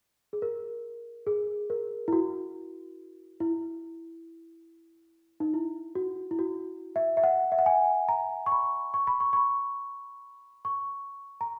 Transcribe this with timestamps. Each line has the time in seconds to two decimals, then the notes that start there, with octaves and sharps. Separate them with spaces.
0.33 G#4
0.42 A#4
1.27 G#4
1.70 A#4
2.08 E4
2.13 F#4
3.40 E4
5.40 D#4
5.54 E4
5.95 F#4
6.31 E4
6.39 F#4
6.96 E5
7.17 E5
7.23 F#5
7.52 E5
7.59 F#5
7.66 G#5
8.08 A#5
8.46 C#6
8.52 B5
8.94 C#6
9.07 B5
9.20 C#6
9.33 C#6
9.37 B5
10.65 C#6
11.41 A#5